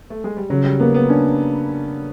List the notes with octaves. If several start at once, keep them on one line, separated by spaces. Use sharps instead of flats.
A3
G#3
G3
C#3 F#3
G3
A#3 B3
B3
C#4 D4